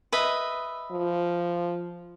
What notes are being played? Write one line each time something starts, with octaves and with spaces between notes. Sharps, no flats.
B4 D#5 E5
F3